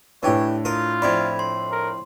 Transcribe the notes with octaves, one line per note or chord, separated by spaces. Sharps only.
A2 E3 D4 G4 C#5
F4 A#4 D#6
F2 E4 D5 B5 G#6
C6
A#4